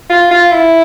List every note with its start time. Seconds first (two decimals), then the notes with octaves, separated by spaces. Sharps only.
0.10 F4
0.31 F4
0.52 E4